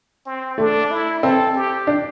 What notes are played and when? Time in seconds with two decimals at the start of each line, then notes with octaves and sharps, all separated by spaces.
0.26 C4
0.58 A3 D4
0.91 E4
1.23 C4 A4
1.55 G4
1.87 D4